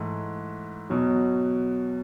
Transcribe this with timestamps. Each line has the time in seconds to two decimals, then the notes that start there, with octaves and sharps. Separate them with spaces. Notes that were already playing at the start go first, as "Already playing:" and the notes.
Already playing: G#2 E3 A3
0.90 E2 B2 F#3